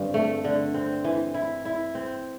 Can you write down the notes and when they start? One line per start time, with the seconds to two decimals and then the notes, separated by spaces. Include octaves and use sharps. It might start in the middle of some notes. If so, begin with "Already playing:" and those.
Already playing: G2 D3 C4
0.14 A3
0.44 D3
0.74 C4
1.04 E3
1.34 E4
1.65 E4
1.95 C4